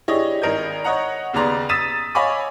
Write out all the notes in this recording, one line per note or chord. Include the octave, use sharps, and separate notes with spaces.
D4 E4 G4 G#4 C#5 D#5
G#1 A#4 D#5 G6
C#5 D#5 F#5 A#5
D#2 C#3 B3 D5 A#5 C6
D#6 E6 A6 B6 D#7 E7
C#5 D#5 F5 G#5 B5 D6